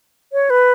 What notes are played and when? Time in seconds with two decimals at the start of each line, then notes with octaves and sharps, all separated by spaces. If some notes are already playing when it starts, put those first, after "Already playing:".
0.33 C#5
0.50 B4